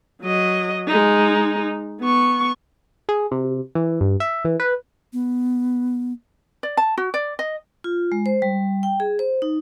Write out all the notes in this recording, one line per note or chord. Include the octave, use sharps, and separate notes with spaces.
F#3 D#5
G#3 D#4
B3 C#6
G#4
C3
E3
G2
E5
E3
B4
B3
D5
A5
F#4
D5
D#5
F4
G#3
C5
G3
G5
G#4
C5
D#4